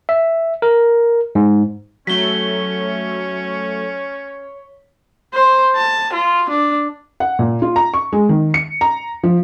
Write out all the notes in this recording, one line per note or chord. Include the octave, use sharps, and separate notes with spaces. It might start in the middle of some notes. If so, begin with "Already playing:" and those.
E5
A#4
G#2
F#3 A3 C#4 C#5 B6 G7
C5
A5
F4
D4
F#5
A#2
F4
A#5
C#6
G#3
D#3
C#7
A#5
F3